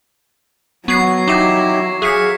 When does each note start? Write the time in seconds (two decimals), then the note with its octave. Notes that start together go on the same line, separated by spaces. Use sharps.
0.88 F#3 B3 C#6 G#6 C7
1.28 D#4 E4 G4 D6 A#6
2.02 G#4 C#5 E5 F5 F#6 B6 C#7